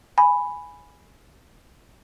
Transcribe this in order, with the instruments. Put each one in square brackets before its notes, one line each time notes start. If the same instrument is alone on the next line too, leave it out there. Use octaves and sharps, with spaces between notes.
[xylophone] G#5 B5